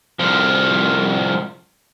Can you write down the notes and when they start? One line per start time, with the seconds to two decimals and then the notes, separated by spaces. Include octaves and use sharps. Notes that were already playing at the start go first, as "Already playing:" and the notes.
0.19 C2 F3